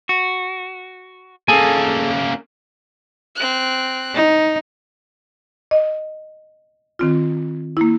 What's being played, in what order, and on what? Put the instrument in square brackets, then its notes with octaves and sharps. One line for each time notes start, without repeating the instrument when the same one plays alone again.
[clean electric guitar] F#4
[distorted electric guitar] A#3 C#4 [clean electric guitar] G#4 A4 G#5
[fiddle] C4 F#6
[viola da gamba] D#4
[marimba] D#5
D#3 C4 F4
A#3 E4